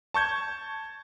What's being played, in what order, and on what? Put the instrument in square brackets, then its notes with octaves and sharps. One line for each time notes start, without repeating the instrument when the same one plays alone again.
[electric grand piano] A5 C#6 G6 G#6